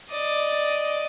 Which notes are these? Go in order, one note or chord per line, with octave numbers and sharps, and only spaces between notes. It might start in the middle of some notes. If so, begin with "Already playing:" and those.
D5 D#5